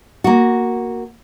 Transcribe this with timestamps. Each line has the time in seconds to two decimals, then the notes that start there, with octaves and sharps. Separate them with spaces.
0.24 A#3 F#4